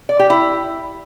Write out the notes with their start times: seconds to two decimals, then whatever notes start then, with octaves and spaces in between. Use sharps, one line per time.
0.09 D5
0.19 G4
0.30 E4